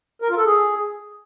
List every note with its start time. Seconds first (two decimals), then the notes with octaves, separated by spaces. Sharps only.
0.22 A#4
0.30 F4
0.37 A4
0.45 G#4